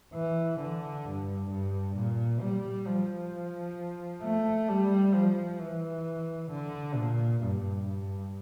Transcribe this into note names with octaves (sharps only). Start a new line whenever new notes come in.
E3
D3
G2
G2
A#2
G3
F3
A3
G3
F3
E3
D3
A#2
G2
G2